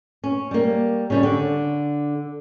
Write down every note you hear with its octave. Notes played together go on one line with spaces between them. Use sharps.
C#4
G3 A#3
C#3 G3 C#4
D3